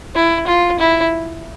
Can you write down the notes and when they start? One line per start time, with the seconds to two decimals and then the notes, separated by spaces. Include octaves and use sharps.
0.15 E4
0.47 F4
0.80 E4